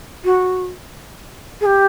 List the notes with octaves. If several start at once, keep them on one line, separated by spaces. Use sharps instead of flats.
F#4
G#4
G4